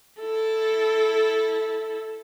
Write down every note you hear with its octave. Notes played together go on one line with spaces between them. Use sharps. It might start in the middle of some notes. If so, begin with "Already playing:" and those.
E4 A4